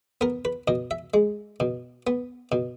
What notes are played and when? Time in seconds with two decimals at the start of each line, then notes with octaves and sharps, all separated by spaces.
0.21 B3 A#4
0.45 B4
0.68 B2 D#5
0.91 E5
1.14 G#3
1.60 B2
2.07 B3
2.52 B2